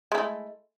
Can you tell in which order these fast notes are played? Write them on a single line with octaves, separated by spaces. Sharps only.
G#3 E4 A3